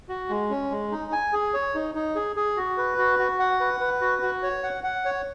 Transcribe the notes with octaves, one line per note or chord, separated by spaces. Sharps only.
F#4
G#3
C#4
G#3
D#4
G#5
G#4
C#5
D#4
D#4
G#4
G#4
F#4
B4
F#4
F#4
F#5
B4
B4
F#4
F#4
C#5
F#5
F#5
C#5